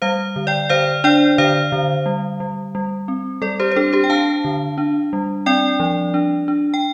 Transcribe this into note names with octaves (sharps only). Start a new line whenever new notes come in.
G3 C5 F5
D3
D5 G5
D3 C5 F5
D4 D5 G5
D3 C5 F5
D3
G3
G3
G3
C4
G3 A4 D5
G4 C5
C5
D4 A4
G4 C5
G5
D4 F5 A5
D3
D4
G3
C4 D5 G5
F3
D4
D4
G5